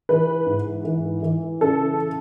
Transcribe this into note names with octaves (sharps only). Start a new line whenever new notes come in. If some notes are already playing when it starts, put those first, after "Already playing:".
E3 B4
G#2
E3
E3
C#3 A4